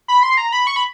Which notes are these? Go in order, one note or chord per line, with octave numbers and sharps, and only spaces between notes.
B5
C6
A#5
B5
C#6
B5